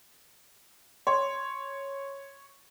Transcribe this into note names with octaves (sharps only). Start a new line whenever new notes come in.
C#5 C6